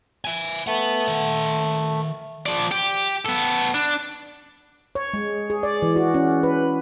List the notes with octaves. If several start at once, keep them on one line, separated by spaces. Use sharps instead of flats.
E5 G#5
A3 B4 F#5
D#3 F#5
F3 D5
G4
B3 A4
D4
C#5
G#3
G#4
D5
E3
F#4
C#4
B4